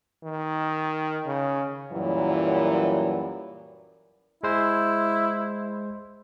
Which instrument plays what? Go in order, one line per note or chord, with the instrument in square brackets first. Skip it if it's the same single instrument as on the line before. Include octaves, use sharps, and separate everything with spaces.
[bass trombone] D#3
C#3
[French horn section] F#2 A#2 E3 F#3 G3
[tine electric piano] G#3 C5 [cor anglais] E4